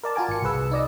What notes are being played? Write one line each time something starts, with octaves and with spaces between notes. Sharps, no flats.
A#4 D5 A5
F4 F#4 A#4 G#5 A5 D6
G#1 C#7
C2 G#4 B4 E6
D#4 D5 D#5